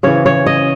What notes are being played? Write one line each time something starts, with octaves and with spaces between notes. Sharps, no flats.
C#3 E3 C#5
C#5
D#5